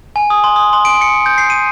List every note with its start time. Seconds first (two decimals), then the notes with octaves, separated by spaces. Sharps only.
0.16 G#5
0.30 D#6
0.44 C6
0.56 D#6
0.73 C6
0.85 D7
1.01 C#7
1.26 G6
1.38 C7
1.50 D#7